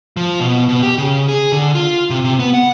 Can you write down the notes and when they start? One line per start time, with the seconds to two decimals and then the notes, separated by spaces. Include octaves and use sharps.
0.17 F3
0.40 B2
0.69 B2
0.83 G4
0.98 C#3
1.29 G#4
1.52 D3
1.75 F4
2.10 C3
2.24 C3
2.39 B3
2.54 F#5